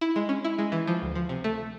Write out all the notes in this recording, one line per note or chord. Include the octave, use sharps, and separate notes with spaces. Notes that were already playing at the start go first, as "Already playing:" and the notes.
E4
G#3
C#4
E4
G#3
E3
F3
D2
F3
C3
A3